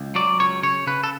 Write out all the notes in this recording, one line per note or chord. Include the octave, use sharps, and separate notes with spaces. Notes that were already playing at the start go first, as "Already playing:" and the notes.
Already playing: C#2
F#3 D5
C#2 C#5
C#3 C#5
C#3 B4
A4